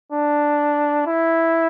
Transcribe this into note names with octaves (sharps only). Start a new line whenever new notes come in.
D4
E4